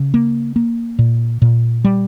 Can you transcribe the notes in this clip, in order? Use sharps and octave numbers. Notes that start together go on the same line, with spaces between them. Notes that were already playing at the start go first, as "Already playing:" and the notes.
Already playing: C#3
A#3
A#3
A#2
A#2
G3